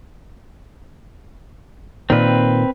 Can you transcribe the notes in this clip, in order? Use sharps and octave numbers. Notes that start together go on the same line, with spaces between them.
A#2 D#3 C4 B4